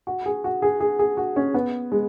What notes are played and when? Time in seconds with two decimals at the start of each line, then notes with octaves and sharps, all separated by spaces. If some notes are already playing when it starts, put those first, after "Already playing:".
0.07 F#4
0.26 G#4
0.44 F#4
0.62 G#4
0.80 G#4
0.99 G#4
1.17 F#4
1.36 C#4
1.54 B3
1.92 G#3